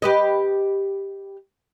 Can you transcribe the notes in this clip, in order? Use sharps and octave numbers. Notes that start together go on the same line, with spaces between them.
G4 B4 D#5